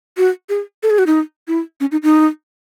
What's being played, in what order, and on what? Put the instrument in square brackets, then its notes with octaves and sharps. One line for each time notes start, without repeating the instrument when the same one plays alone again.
[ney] F#4
G#4
A4
G#4
F#4
D#4
E4
C#4
D#4
D#4